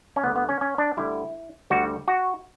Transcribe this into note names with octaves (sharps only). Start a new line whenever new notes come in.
C#4
D2 D3 G3 B3
B3
C#4
C#4
D4
D2 D3 G3 E4
D2 D3 G3 F#4
F#4